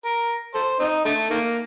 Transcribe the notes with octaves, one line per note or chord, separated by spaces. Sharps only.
A#4
A4 C5
C4 D#4
D3 A3
D#3 A#3